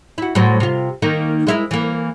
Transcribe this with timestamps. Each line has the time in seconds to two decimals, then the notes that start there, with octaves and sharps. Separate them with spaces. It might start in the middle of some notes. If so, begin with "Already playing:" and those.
0.18 E4 F#4
0.35 A2 F#3 C5
0.60 C3 F4
1.02 D#3 A#3 D#4
1.47 G#3 E4 A#4
1.71 E3 A#3